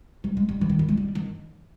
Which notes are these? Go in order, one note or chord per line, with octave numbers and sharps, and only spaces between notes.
G3
G#3
G3
E3
D#3
G3
G#3
G3
D#3